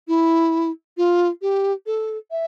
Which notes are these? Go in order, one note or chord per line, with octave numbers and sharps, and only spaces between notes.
E4
F4
G4
A4
E5